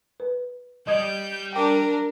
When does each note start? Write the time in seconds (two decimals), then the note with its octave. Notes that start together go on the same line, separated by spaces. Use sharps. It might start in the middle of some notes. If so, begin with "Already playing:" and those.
0.20 B4
0.87 G3 G4 D#5 D#6 G6 G#6
1.53 D4 A#4 G5 D6